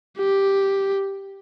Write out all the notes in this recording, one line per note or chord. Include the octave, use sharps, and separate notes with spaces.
G4